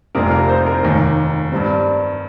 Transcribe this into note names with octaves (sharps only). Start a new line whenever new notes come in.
F1 F2 C3 G3 A#3 A#4
A#4
C5
A#4
F1 D#2 D#3
G2 G3 C4